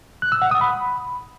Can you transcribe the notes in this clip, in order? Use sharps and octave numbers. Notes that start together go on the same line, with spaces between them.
F#6
E6
F#5
D#6
B5